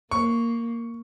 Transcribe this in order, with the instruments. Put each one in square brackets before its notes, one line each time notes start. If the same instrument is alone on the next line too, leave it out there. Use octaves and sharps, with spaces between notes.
[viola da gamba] A#3 [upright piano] C#6